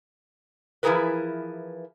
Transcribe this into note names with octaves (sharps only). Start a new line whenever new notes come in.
E3 F3 E4 G#4 A#4 B4